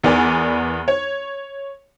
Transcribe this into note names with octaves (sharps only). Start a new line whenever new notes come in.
E2 B3 A#4 D5 G#5
C#5